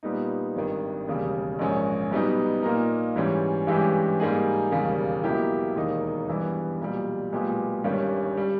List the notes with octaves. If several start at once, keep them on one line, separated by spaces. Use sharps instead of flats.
A#2 G3 B3 D#4
G#1 G2 D#3
E1 D#2 C#3 G3
A#1 G#2 D#3 G#3 C#4
B1 B2 G3 B3 D#4
A#2 A#3 D#4 A#4
G#2 E3 G3 C#4
G2 E3 G#3 C#4 G4
G#2 G3 A#3 D#4 G#4
E1 D#2 C#3 G3 A#3
B1 B2 A#3 E4 G4
E1 D#2 D#3 A#3 D#4
G2 E3 G3 B3
B1 A#2 G3
B1 A#2 G#3 B3 G4
G1 G2 D#3 G3 C#4
G3